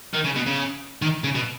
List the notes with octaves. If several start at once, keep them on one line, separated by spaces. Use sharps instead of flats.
D#3
C#3
B2
C#3
D#3
C#3
B2